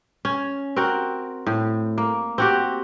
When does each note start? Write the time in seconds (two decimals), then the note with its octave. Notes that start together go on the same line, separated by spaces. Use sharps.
0.25 C#4
0.76 C4 F#4 A#4
1.47 A2
1.98 A#3
2.38 C4 F#4 G4